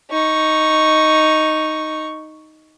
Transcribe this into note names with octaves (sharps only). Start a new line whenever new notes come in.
D#4 C#6